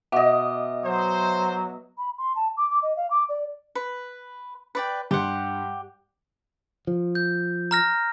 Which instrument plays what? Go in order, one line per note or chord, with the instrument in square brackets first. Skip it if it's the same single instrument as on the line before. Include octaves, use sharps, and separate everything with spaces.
[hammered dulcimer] B2 D#5 [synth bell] E5 F#5 D6
[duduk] F#3 [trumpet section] C5
[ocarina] B5
C6
A5
D6
D6
D#5
F5
D6
D5
[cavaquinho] B4
B4 D5 G5
[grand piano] G2 C6 [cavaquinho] G4 F#5
[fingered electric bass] F3
[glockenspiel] G6
A#5 F6 A#6